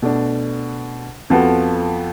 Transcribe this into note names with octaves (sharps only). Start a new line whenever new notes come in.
B2 A3 D4
F2 F3 B3 F#4 A4